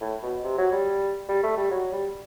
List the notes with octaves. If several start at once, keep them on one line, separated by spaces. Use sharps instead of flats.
A2
B2
C3
F#3
G3
G3
A3
G3
F#3
G3